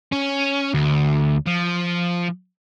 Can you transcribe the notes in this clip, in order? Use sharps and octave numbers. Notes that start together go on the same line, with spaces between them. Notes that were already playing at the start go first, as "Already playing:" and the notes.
C#4
D2
F3